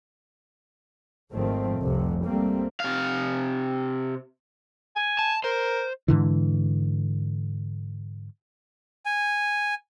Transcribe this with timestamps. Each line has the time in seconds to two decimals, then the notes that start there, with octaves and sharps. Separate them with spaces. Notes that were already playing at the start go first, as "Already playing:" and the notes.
1.32 G#1 D#3 F3 A3 C4
1.79 F1 C2 C3
2.24 C2 G3 A3 A#3 C4
2.80 C3 F5
4.96 G#5
5.19 A5
5.44 A#4 C5
6.08 G#2 D3 E3
9.06 G#5